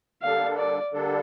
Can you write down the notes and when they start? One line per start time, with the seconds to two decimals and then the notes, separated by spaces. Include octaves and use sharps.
0.22 D3 G3 A#3 D4 A4 F5
0.58 D5
0.93 D3 G3 A#3 D4 A4